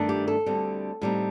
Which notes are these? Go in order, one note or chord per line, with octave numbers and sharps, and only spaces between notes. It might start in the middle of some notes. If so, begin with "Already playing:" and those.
Already playing: G2 D#3 A3 D4
G4
A4
D2 D3 G3 C4
A2 G3 C4 D#4